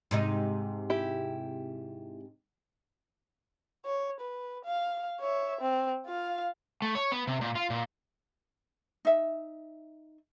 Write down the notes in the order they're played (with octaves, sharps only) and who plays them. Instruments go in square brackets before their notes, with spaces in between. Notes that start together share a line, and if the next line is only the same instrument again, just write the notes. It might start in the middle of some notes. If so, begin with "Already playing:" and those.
[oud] G#2 C3 D#4
[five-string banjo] E4 G4
[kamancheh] C#5
B4
F5
C#5 E5
C4
F4 F5
[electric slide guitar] A3
C#5
B3
C3
A#2
F4
A#2
[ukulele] D#4 E5